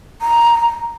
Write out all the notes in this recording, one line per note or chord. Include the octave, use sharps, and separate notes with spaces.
A#5